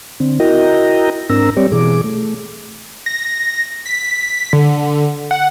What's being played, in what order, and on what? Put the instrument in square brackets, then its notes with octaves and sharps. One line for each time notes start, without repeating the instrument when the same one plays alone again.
[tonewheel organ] D3 C4
E4 F#4 A#4 D#5 G5 A#5
G#2 C4 D4 A#4 A#5 E6
G3 C4 G4 C#5 D5
B2 E3 G#4 D6
A3
[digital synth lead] A#6
B6
D3
F#5